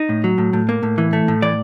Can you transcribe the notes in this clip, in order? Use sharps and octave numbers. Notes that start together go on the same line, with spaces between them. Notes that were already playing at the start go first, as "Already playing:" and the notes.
Already playing: D#4
A2
F#3
A2
A2
A#3
A2
E3
A3
A2
E3 D5